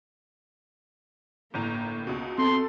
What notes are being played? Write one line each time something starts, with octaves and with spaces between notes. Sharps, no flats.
G1 A2 A#3 A#5
C#2 B2
C4 A4 C6